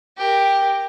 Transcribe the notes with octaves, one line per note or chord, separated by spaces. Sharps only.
G4 A#4